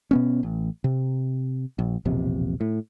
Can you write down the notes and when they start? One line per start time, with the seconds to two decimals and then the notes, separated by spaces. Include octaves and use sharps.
0.11 B2 B3 C#4
0.43 A1
0.84 C3
1.79 A#1
2.05 E1 A#1 C3
2.61 A2